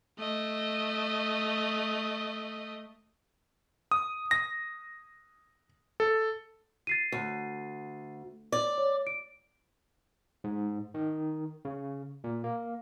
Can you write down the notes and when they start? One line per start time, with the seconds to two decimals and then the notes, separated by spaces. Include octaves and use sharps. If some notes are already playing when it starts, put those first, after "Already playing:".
0.19 A3 D#5
3.91 D#6
4.31 A#6
6.00 A4
6.87 A6 C7 D#7
7.12 D2
8.52 D5
8.78 C#5
9.07 D7
10.44 G#2
10.94 D#3
11.65 C#3
12.24 A#2
12.44 A#3